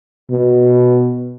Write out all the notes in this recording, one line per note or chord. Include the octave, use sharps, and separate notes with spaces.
B2